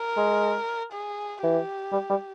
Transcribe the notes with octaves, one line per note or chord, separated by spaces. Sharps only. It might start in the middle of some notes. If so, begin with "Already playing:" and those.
Already playing: A#4
G#3
G#4
E3 G4
G3
G3